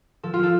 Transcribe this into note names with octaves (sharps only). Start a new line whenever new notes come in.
F3 A4
F4
F3 A4